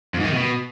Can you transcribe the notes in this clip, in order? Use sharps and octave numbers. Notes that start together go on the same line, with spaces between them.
F2
G#2
D#3
C3
B2